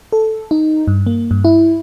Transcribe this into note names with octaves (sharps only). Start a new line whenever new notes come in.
A4
D#4
G2
A#3
G2
E4